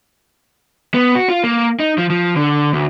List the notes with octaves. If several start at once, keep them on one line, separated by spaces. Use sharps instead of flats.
B3
F#4
F4
A#3
D#4
F3
F3
D3
D2